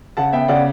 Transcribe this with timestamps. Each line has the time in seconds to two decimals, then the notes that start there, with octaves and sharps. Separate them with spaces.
0.17 C#3 F#5 A5
0.33 B3 E5 G5
0.48 C#3 D5 F#5